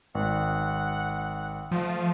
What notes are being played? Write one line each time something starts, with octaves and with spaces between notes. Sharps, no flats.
G#1 F#5
F3 A3